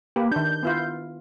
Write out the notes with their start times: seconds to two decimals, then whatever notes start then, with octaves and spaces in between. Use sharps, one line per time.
0.16 A#3 G4 B4
0.32 D#3 D4 G6
0.63 B3 E4 F4